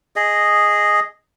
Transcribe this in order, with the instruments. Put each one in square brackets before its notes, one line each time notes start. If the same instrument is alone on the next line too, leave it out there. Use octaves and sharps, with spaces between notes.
[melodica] G#4 D#5